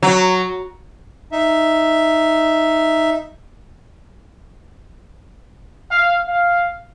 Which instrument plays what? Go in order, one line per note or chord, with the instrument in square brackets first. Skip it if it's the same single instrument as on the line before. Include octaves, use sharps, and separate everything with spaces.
[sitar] F#3
[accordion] D#4 E5
[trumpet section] F5
F5